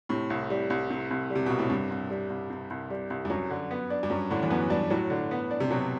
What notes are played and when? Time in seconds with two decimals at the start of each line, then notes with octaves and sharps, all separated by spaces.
0.09 A2 C3
0.30 C2
0.50 G3
0.70 C2
0.90 C3
1.11 C2
1.30 G3
1.35 C3
1.46 C2 B2
1.59 A2
1.70 G2 C3
1.91 C2
2.10 G3
2.30 C2
2.50 C3
2.70 C2
2.90 G3
3.10 C2
3.25 G2
3.30 F#2 F#3
3.50 D3
3.71 B3
3.90 D4
4.03 G2
4.10 F#2 F#3
4.30 A2 D3
4.43 E2
4.50 F#2 B3
4.70 G2 D4
4.90 A2 F#3
5.10 D3
5.31 B3
5.51 D4
5.60 C3
5.70 B2 F#3